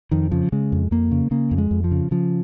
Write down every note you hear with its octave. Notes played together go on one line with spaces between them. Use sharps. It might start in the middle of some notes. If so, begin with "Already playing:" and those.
F2 D#3
C#3 F3
C#3 G#3
F2
F2 A#3
C#3
C#3 A#3
F2
G#3
F2
F3
C#3
C#3 F3